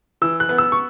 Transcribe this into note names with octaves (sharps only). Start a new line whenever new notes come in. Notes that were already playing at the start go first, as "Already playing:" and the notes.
E3 E6
F#6
B3
E6
C#6